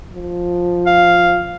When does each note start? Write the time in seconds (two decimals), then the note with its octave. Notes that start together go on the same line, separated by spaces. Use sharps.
0.14 F3
0.86 F5